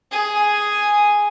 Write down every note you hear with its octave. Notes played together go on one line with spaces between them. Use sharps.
G#4